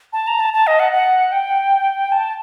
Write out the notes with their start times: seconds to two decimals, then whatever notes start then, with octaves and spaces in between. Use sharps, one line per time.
0.13 A5
0.27 A#5
0.40 A5
0.53 A5
0.67 D#5
0.79 F#5
0.92 F#5
1.32 G5
2.12 A5